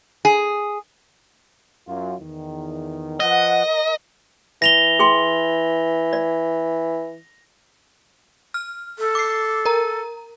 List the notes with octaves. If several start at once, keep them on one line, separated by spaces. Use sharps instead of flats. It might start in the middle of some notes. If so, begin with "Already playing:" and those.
G#4
F#2 F4
E2 D#3
F3 B4 D#5 F#5
A#4
E3 A#6 F7 G7
G#4 G5 C6
D5
F6
A4
D6 C7
A#4 A#5